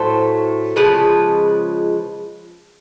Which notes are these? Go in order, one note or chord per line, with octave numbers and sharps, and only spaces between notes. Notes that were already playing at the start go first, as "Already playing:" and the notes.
Already playing: A2 F#3 A3 C5
C#3 F3 G#3 B4